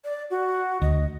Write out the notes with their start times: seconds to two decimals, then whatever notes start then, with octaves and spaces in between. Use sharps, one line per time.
0.04 D5
0.30 F#4
0.82 D2 D#5